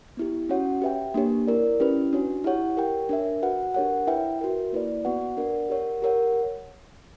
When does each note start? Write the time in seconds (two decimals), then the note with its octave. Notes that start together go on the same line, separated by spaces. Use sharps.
0.17 B3 E4 G4
0.49 C#4 F#4 C#5 F#5
0.82 G4 B4 E5 G5
1.14 A#3 D4 G4 C#5
1.47 E4 A#4 D5
1.80 C#4 E4 G4 B4
2.13 D4 F#4 C#5
2.44 E4 G4 C#5 F#5
2.77 G4 A#4 C#5 G5
3.09 D4 A#4 E5
3.42 F#4 B4 F#5
3.75 D4 G4 A#4 C#5 F#5
4.07 E4 B4 E5 G5
4.39 F#4 A#4 E5
4.72 A#3 E4 B4 D5
5.05 B3 F#4 B4 F#5
5.37 D4 A#4 D5 F#5
5.69 G4 A#4 C#5 F#5
6.02 G4 A#4 C#5 F#5